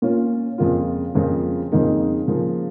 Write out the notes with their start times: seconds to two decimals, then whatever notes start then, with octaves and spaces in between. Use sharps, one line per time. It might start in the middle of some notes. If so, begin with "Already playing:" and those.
0.02 A#2 A#3 C#4 F4
0.58 F2 C#3 A#3 F4
1.15 F2 C#3 F3 A#3 F4
1.72 F2 C#3 A#3 D#4
2.28 C#3 F3 A#3 F4